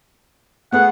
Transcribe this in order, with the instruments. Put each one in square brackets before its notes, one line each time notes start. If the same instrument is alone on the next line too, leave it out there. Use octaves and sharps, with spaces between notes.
[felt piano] A3 B3 G#4 [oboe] F#5